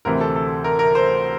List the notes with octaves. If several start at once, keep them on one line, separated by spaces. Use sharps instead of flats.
D2 C3 E3 A#4
A4
A4
A#4
A#4
C5